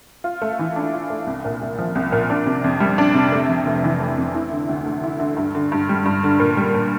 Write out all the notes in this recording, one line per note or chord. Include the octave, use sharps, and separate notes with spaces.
F4
A3
E3
D4
F4
A3
C2
A#2
C2
F3
C2
A#2
D4
C3
F2
G3
D4
C3
A3
F2
F1
E3
A3
F2
E4
D3
D2
A3
E4
D3
G2
D3
G2
G3
G2
D3
A#2
G3
A#2